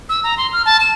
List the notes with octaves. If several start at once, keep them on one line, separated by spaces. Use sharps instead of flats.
E6
A#5
C6
F6
A5
E7